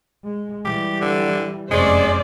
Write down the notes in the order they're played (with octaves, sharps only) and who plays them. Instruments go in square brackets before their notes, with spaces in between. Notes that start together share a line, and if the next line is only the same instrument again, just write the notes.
[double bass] G#3
[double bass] E3 G3 [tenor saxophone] G4
[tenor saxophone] D3
[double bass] F1 F#2 [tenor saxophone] G#3 [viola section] C#4 C5 D5